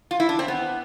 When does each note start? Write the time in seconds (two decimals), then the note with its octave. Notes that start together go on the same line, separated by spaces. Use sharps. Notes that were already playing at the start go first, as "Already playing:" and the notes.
0.11 F4
0.20 E4
0.29 D4
0.39 C4
0.48 B3